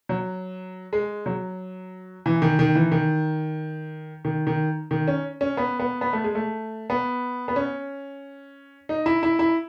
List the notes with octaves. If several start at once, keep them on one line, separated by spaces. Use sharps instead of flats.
F#3
G#3
F#3
E3
D#3
D#3
E3
D#3
D#3
D#3
D#3
C#4
C#4
B3
B3
B3
A3
G#3
A3
B3
B3
C#4
D#4
E4
E4
E4